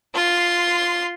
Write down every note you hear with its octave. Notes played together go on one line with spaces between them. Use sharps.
F4 C6